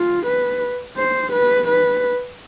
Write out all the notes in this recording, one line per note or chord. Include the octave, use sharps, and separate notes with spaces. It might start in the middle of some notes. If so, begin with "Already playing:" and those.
Already playing: F4
B4
C5
B4
B4